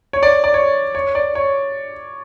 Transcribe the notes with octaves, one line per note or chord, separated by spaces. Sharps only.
C#5
D5
D5
C#5
C#5
D5
C#5